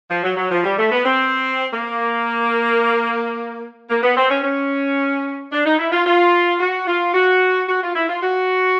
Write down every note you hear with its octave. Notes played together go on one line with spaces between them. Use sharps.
F3
F#3
F#3
F3
G3
A3
B3
C4
A#3
A#3
B3
C4
C#4
C#4
D4
D#4
E4
F4
F4
F#4
F4
F#4
F#4
F4
E4
F4
F#4